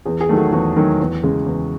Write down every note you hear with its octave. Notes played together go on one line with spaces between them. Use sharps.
E2 G#4
G#4
D#3 F#3 A3
F#4 A4
E2 F#4
D#3 F#3 A3
E2
C#3 G#3
E2